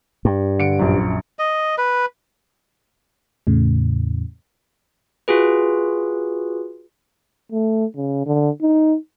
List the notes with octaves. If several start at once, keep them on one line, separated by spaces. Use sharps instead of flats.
G2
D3 C#7 D7
A#1 F#2
D#5
B4
E2 A2 C#3
F4 F#4 G#4 B4
A3
C#3
D3
D#4